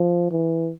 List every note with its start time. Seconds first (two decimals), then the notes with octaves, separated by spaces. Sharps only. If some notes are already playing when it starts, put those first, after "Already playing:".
Already playing: F3
0.31 E3